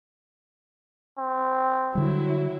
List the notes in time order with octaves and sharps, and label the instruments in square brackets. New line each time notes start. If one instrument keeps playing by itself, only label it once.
[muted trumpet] C4
[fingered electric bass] D3 G3 [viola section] F#3 E4